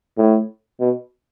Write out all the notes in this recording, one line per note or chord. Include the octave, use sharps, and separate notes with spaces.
A2
B2